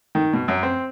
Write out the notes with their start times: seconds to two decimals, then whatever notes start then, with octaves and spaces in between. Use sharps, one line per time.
0.15 D#3
0.33 B2
0.48 F#2
0.63 C4